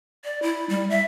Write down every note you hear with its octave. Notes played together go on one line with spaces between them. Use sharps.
D5
E4
G3
E5